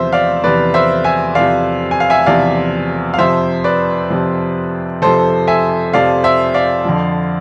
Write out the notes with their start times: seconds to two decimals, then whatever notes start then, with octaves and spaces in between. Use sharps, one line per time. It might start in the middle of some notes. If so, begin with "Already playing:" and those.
Already playing: E2 C3 F3 C5 E5
0.13 D5 F5
0.44 E2 C3 F3 B4 D5
0.74 C5 E5
1.04 E5 G#5
1.35 E2 C3 F3 D5 F5
1.91 G#5
2.00 F5
2.10 E5 G#5
2.26 E2 C3 F3 D5 F5
3.14 F5
3.18 F2 C3 F3 C5 E5
3.64 B4 D5
4.10 F2 C3 F3
5.02 F2 C3 F3 A4 C5
5.47 E5 G#5
5.93 F2 C3 F3 D5 F5
6.24 C5 E5
6.54 D5 F5
6.85 F2 D3 F3